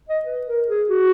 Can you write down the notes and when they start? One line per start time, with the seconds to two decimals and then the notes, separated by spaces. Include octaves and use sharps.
0.09 D#5
0.25 B4
0.46 A#4
0.68 G#4
0.89 F#4